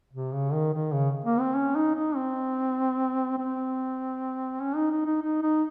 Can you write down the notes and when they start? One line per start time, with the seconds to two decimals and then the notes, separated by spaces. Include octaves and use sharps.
0.13 C3
0.33 C#3
0.53 D#3
0.74 D#3
0.94 C#3
1.25 A#3
1.40 C4
1.55 C#4
1.76 D#4
1.96 D#4
2.16 C4
3.38 C4
4.60 C#4
4.76 D#4
4.91 D#4
5.06 D#4
5.22 D#4
5.42 D#4